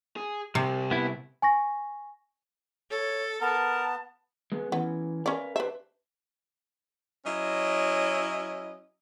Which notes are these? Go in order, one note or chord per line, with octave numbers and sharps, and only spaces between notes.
G#4
C3 G3 C4
B3 E4
G#5 C#6 A#6
A4 C#5
B3 A#4 A5
G#3 B3
E3 B3 C#4
C#4 A#4 B4 D5 F5
D4 G4 B4 C5 E5
F#3 C#4 E4 D#5